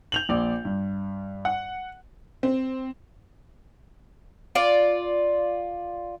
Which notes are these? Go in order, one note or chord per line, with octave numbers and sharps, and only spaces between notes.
G6 F7 F#7
A#1 D5
G2
F#5
C4
F4 D5